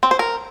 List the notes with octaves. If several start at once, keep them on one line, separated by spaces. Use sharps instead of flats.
C4
C5
A#4